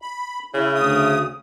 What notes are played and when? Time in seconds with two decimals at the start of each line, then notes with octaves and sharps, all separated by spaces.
0.02 B5
0.54 C#3 E4
0.75 D2 D#6